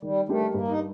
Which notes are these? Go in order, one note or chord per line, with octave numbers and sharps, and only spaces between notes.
D#3 G3
G3 A3 D4 G4 A#4
G2 A#3
D#4